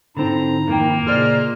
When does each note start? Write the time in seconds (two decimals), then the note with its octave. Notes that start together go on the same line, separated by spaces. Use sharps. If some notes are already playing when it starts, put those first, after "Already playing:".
0.17 G#2 D3 C4 D#4 E4 A#5
0.68 F2 D#3 A#3 G5
1.07 A#2 C#3 D#4 G#4 C5 D5 F6